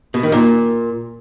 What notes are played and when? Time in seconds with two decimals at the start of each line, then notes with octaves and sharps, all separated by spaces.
0.14 B2
0.23 D#3
0.32 A#2